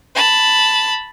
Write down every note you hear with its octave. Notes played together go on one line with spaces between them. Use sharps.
A5 B5